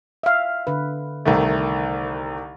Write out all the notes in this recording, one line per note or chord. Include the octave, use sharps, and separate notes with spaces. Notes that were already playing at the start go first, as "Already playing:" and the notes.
E5 F5
D3 B4
C2 D#3 A3